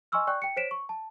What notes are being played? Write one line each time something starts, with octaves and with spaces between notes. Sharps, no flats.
D#5 G#5 C6 C#6 E6 F6
D5 G5 C#6 F#6
G5 C#7
C5 C#5 B6 D7 E7
C#6
A5